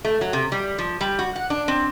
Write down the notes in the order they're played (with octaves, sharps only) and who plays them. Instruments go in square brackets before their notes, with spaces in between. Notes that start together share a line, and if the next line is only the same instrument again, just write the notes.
[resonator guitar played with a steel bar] A3
F#3
C3
G3
F3
G3
F#4
F#5
D4
C4